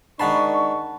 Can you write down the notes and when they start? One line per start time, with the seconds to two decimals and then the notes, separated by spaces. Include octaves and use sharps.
0.20 D#3 G#3 D4 C5 F#5 A5 B5 C#6